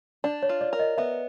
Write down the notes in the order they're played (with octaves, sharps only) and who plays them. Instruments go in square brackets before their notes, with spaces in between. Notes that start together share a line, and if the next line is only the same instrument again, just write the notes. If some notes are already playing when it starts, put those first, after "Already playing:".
[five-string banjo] D4 [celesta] D5
[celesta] C#5
[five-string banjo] F4
[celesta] D5
[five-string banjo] A#4
[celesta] D#5
[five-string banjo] B3 [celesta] E5